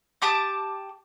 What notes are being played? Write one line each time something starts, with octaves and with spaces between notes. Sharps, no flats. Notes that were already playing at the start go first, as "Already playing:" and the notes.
G4 A5 D6 D#6